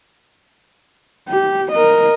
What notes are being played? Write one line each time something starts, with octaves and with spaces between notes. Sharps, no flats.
G4
A#4 D#5